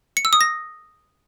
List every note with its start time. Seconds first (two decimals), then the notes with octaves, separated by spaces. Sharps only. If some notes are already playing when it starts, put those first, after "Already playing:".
0.17 C#7
0.25 E6
0.33 D#6
0.41 A#6